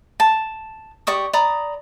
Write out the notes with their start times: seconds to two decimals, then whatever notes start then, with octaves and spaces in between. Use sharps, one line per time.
0.20 A5
1.07 G4 D5 C#6 D#6
1.33 D5 A#5 B5 D#6